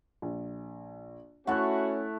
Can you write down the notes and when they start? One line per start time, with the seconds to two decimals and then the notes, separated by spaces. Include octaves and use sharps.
0.22 A#1
1.47 A3 C#4 E4 F#4 F#5 A5 F#6